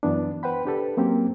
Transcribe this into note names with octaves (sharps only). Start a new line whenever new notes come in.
F#2 E3 B3 D4
B4 C5 F#5 G5 B5
D4 G4 A4 B4
F#3 A#3 C4 C#4 G4